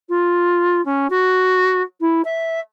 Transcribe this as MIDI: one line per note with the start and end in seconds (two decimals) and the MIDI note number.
0.09 0.83 65
0.85 1.07 61
1.10 1.82 66
2.00 2.22 64
2.24 2.60 76